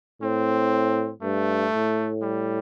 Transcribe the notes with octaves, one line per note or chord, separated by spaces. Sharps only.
A2 C4
G2 A3
A2
G3